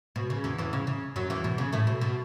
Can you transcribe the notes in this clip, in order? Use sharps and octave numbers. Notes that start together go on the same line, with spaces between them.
B2
C#3
E2 E3
E2 E3
C#3
C#3
F#2 F#3
E2 E3
B2
C#3
A2 A3
B2
B2